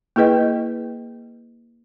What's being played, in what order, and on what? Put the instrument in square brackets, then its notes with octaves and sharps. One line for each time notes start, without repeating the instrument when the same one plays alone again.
[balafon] A#3 E4 G#4 B4 D#5 G5